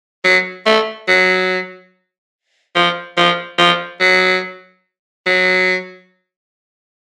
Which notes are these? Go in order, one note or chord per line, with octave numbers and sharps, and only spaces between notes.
F#3
A3
F#3
F3
F3
F3
F#3
F#3